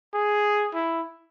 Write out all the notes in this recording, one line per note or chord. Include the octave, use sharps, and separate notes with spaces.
G#4
E4